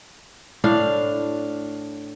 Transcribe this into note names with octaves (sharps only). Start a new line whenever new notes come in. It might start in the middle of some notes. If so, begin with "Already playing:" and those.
A2 D4 F5